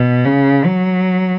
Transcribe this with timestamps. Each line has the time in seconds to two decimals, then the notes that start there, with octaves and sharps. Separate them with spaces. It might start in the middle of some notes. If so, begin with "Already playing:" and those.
Already playing: B2
0.25 C#3
0.65 F#3